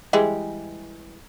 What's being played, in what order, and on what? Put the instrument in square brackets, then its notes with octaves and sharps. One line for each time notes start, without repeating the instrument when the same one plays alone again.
[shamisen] E3 G3 G#3